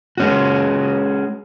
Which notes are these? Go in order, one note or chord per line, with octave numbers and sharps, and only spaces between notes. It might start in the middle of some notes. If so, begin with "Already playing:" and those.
G#3 C#4 F#4